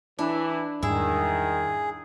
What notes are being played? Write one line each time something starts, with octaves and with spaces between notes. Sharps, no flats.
E3 D4 E4
E2 G#2 D#3 G3 E4 G#4